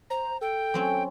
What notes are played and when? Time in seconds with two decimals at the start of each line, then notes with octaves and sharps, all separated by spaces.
0.10 C5 A#5
0.41 A4 G5
0.74 F#3 C4 C#4